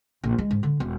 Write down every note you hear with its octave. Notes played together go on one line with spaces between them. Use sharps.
A#1
G#3
G#2
D3
E1